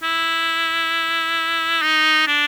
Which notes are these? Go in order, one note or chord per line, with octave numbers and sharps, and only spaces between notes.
E4
D#4
D4